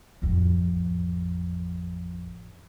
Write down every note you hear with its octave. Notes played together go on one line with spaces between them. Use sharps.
A1 F2